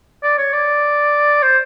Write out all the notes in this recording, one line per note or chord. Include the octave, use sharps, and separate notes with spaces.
D5
C#5
D5
C5